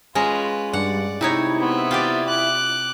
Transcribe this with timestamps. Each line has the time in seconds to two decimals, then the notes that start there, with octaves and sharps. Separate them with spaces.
0.15 G#3 C#4 F4 B4 A#5
0.73 G2 D5 F#5
1.21 C3 D#4 E4 C#5
1.58 B3 C4
1.91 F4 G4 D5
2.27 D6 F#6